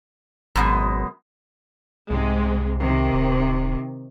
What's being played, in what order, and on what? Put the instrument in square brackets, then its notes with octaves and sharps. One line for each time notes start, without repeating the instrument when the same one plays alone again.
[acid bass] G#1 [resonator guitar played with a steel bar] F#2 B2 G#3
[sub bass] C2 [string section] G#2 C3 G#3
[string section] C3 D#3
[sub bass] D1